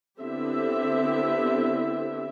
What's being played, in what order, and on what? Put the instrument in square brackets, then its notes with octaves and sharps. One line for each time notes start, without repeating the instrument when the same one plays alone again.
[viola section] D3 B3 C4 E4 G4 E5